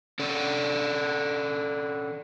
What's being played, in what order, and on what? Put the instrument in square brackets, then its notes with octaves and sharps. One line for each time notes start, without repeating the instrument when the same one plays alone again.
[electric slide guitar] C#4 A4 D5